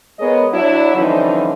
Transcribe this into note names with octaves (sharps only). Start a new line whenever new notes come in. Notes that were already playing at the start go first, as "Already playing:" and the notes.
G#3 B3 G#4 A#4 C#5 D#5
F#3 D4 E4
D3 E3 F3 G3 C#4 D#4